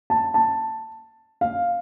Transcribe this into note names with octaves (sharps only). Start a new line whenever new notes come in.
A5
A5
F5